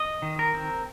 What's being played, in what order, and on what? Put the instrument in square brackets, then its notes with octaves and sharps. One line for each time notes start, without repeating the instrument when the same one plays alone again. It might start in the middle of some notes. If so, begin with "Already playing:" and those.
Already playing: [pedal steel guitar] D#5
D#3
A#4
C4